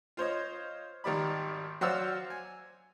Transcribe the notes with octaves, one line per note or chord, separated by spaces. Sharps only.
F4 C5 C#5 D#5
G#1 D#3 G3 D5 B5
F#3 F#4 C5 D5 F5 E6
G#5